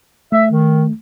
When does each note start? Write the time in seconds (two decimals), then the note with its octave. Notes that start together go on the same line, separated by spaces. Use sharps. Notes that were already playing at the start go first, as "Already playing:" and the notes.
0.32 A3 E5
0.51 D#3